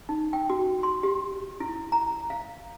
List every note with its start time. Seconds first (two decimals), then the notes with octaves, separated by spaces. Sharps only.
0.09 D#4
0.33 G5
0.50 F#4
0.83 C6
1.03 G4
1.60 E4
1.92 A#5
2.30 F5